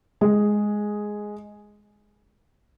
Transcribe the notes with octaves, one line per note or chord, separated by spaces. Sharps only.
G#3 G#4